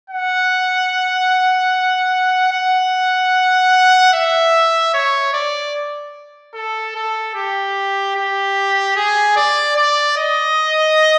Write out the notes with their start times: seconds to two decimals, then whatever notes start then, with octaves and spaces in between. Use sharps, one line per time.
0.10 F#5
2.52 F#5
4.14 E5
4.94 C#5
5.34 D5
6.54 A4
6.95 A4
7.35 G4
8.16 G4
8.96 G#4
9.37 D5
9.76 D5
10.17 D#5